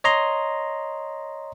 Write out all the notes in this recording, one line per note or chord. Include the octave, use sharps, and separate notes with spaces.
C#5 D#5 A#5 C6